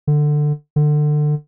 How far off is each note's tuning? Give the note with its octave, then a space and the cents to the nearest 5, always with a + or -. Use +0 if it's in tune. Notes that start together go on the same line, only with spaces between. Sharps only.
D3 +15
D3 +25